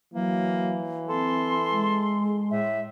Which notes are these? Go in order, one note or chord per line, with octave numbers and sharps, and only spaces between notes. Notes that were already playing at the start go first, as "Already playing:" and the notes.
E3 F#3 A#3
C4 A4 C6
G#3
A2 E5